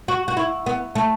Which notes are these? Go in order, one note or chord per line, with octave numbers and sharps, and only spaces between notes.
F#4
F#4
E4
B3
A3